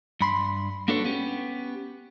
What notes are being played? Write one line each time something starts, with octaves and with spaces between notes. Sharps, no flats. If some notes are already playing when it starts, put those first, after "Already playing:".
G2 B5 C6
A#3 D4 F#4 A4 B4 C#5
B3 C#4 G4